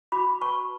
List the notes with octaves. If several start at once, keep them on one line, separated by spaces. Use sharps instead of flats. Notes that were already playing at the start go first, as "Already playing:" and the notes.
F#4 B5 D6
B4 A5 C#6